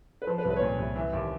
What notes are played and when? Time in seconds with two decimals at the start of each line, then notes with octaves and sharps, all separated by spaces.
0.22 B4
0.27 F3 C5
0.38 B4
0.45 C2
0.50 B4
0.56 C#5
0.61 A#2 C5
0.79 C2
0.96 E3
1.13 D#2